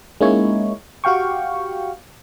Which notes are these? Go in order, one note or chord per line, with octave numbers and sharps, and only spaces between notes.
G#3 A#3 C#4 D#4 E4 C#5
F#4 G4 F5 G5 C#6